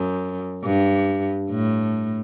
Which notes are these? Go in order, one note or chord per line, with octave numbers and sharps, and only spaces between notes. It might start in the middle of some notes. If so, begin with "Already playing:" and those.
Already playing: F#2
G2
A2